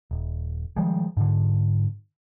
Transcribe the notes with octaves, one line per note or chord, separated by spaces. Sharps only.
D#1
D#3 F3 G3 G#3
G#2 D3